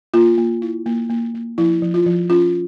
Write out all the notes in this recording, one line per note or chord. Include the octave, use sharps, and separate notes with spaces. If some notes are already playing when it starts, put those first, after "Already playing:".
A#3 F4
A#3
E4
A#3
A#3
A#3
F3 E4
F3
F4
F3
C#4 F4